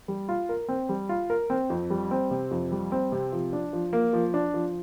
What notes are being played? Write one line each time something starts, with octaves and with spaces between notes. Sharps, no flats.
G3
F4
A#4
C4
G3
F4
A#4
C4
F2
G3
C4
C3
F2
G3
C4
C3
F3
D4
F3
A#3
F3
D4
F3